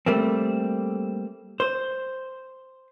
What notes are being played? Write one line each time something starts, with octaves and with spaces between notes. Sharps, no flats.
G3 A3 A#3 C4
C5